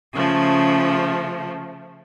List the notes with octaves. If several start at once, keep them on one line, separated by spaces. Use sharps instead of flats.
C#3 F3 A3